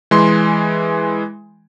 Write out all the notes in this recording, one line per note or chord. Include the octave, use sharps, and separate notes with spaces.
E3 G#3 C6